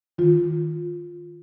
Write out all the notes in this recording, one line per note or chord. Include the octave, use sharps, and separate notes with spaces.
D#3 F4